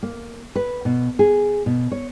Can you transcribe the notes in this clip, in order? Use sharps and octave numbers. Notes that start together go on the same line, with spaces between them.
A#3
B4
B2
G#4
B2
C#5